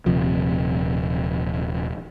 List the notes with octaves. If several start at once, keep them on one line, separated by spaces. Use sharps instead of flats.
D#1 C3 F3